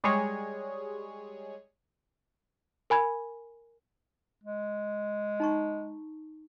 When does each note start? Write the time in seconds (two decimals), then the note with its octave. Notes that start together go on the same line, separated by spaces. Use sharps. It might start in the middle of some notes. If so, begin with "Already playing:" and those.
0.04 G3 G#3 G#4 C#5
2.90 A#4 G#5 B5 G#6
4.44 G#3
5.40 D#4 A#5 C#6